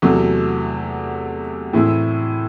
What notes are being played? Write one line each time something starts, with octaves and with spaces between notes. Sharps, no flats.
E2 C3 F#3 A3
A2 E3 C4 E4 G#4